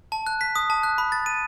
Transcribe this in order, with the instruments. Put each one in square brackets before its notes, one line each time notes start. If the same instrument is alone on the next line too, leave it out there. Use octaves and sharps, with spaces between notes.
[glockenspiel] A5
F#6
B6
D#6
A5
F#6
B5
A6
D#7